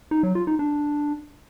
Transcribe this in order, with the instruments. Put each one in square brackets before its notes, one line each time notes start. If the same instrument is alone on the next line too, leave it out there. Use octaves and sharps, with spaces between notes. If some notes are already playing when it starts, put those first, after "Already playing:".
[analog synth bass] D#4
F#3
F4
D#4
D4